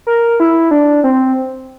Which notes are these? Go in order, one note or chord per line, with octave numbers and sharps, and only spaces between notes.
A#4
E4
D4
C4